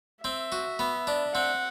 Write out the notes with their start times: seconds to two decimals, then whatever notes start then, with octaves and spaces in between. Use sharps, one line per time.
0.24 C4 E5
0.52 F#4
0.79 B3
1.07 D4
1.35 C4 F#5